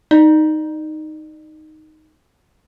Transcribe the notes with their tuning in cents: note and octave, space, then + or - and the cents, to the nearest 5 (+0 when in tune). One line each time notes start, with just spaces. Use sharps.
D#4 +0 D5 +40